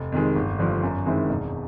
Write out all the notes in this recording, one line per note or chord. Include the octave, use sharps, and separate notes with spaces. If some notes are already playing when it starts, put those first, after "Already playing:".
Already playing: F1
F2 C3 D#3 G#3
G1
G2 D3 F3
F#2
D#3 G#3 C4 E4
E1